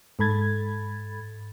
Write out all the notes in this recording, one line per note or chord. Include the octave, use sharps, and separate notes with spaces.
G#2 A4 B5 G#6 A6